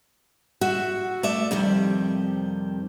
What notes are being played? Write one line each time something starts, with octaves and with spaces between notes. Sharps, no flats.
F#4 E5
A3 D5 E5
F2 C3 D#3 G3